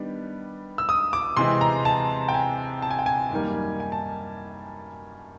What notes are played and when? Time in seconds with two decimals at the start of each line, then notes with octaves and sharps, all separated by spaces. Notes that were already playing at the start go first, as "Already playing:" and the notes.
Already playing: D#3 G3 B3 D4
0.78 E6
0.89 D#6
1.13 D6
1.37 C3 E3 G#3 C4 C6
1.61 A#5
1.85 A5
2.29 G5
2.34 G#5
2.82 A5
2.91 G#5
2.99 G5
3.06 G#5
3.31 F#2 D#3 G3 A#3
3.80 G#5
3.92 A5